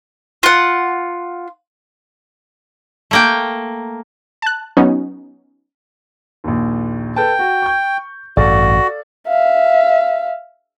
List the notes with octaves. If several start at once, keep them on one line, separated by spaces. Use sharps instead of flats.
F4 F#5
A3 A#3 G5
A5 F#6
F#3 B3 C#4 D#4 F#4
A#1 D#2
A4 B4 G5 A5
F#4
C#6 G6
A1 G2 F#4 A4 D5 F5
E5 F5